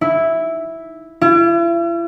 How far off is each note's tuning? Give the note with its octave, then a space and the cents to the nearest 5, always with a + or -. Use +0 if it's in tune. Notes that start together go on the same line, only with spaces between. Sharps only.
E4 -5
E4 +45